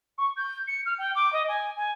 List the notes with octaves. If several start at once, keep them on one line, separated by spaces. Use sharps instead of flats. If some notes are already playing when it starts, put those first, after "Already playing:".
C#6
G6
C#7
F6
G5
D6
D#5
G#5
G#5